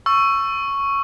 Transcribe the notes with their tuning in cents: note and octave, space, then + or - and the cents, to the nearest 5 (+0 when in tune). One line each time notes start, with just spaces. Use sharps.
C#6 +0 E6 +20